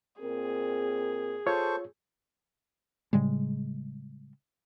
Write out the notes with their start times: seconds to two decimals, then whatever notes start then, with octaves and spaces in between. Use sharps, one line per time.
0.21 A#2 C4 G#4 A#4
1.46 F4 A4 C5 C#5 C#6
3.13 A2 C#3 G3 G#3